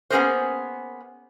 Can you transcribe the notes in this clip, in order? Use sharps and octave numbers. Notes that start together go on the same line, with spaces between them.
A#3 B3 C#4 G#4 A#4 C5